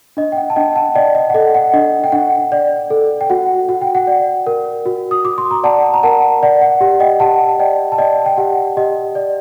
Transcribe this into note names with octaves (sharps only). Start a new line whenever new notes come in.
D4 D#5
G5
F#5
A5
D4 D#5 G5
F#5 A5
D5 D#5 G5
D#5
F#5
A4 D#5
F#5
D4 D#5
G5
D4 F#5
D5
A4
G5
F#4 F#5
F#4 F#5
G5
F#5
D5
A#4
F#4
D#6
F#4 D6
C6
A#5
D5 F#5 A5
A#5
A#4 F#5 A5
D5 F#5
F#5
G4 F#5
D#5 G5
G4 F#5 A5
D5 D#5 G5
A5
D5 D#5 G5
G5
G4 F#5
G4 D#5
D5